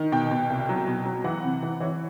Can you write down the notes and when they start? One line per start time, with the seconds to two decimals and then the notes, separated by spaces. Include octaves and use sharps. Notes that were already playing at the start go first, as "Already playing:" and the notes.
Already playing: D#3
0.12 B2 G5
0.31 B2
0.50 C2
0.69 F#3
0.87 B2
1.06 F#3
1.24 E3 F#5
1.43 C3
1.63 E3
1.80 E3 C#5